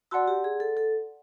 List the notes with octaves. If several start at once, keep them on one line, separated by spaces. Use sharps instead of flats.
F#4 D5 F#5 A5 C6 E6
G4
G#4
A4
A4